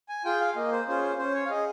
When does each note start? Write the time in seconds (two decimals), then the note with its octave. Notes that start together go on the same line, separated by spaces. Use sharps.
0.09 G#5
0.25 F4 G#4 G5
0.41 F5
0.56 A#3 D#5
0.71 C5
0.88 C#4 F4 G#4 C5
1.03 C5
1.18 C#4 C5
1.34 C#5
1.45 F5
1.50 G#4 D#5